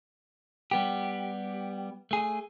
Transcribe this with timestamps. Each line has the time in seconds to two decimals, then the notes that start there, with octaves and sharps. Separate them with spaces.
0.71 G3 B3 G4
2.11 A3 G#4